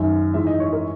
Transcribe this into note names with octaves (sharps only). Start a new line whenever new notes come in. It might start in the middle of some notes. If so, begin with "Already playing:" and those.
Already playing: F#2 D#3 E5
G#2 E3 E5
D#5
C#5
A#4